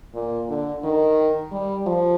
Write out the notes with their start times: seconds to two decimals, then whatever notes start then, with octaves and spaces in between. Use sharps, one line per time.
0.14 A#2
0.49 D3
0.84 D#3
1.52 G3
1.87 F3